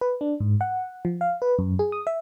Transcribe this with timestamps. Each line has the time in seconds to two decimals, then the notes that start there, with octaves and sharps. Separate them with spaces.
0.01 B4
0.21 D4
0.40 G#2
0.61 F#5
1.05 F3
1.21 F5
1.42 B4
1.59 F#2
1.79 G#4
1.92 D#6
2.07 E5